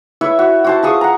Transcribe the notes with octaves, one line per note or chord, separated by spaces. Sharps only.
E4 B4 C#5 E5
F#4
F#4 C5 A5
F4 G#4 C#6 D#6
F#5 A#5